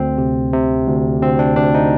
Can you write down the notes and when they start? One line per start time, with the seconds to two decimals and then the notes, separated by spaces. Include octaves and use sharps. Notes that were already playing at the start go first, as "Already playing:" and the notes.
Already playing: D2 C4
0.18 C3
0.53 C3
0.87 D2
1.22 D2 C4
1.39 D4
1.56 D2 D4
1.74 D#4